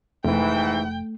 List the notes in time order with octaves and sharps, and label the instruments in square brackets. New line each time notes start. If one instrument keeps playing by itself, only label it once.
[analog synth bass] F1 [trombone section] G#2 E3 [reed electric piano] A3 [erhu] G5